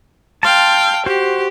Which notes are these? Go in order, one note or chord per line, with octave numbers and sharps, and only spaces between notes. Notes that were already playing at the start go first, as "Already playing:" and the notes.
F5 G5 A5 C6
F#4 G4 C5